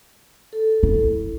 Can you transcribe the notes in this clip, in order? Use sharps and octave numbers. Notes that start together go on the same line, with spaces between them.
A4
E4